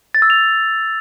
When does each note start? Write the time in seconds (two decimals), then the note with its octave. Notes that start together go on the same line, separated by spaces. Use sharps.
0.15 A6
0.22 E6
0.30 F7